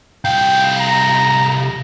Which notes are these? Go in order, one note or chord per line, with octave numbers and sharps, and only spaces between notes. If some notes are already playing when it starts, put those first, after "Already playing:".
C2 F5 G5
A#5